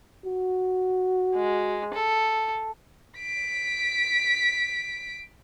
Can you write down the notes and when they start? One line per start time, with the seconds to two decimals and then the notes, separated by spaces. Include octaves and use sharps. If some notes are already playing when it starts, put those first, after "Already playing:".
0.25 F#4
1.35 G#3
1.94 A4
3.19 B6 D7